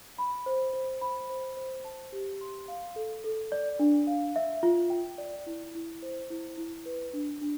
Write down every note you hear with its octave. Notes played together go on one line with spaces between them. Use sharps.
B5
C5
C5
B5
C5
C5
A5
G4
C6
F5
A4
A4
D5
D4
F5
E5
F4
G5
D5
E4
E4
C5
E4
E4
B4
D4
D4